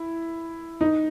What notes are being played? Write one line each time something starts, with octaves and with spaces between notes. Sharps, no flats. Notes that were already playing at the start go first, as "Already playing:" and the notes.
Already playing: E4
D#4